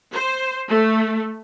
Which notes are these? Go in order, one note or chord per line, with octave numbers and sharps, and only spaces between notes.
C5
A3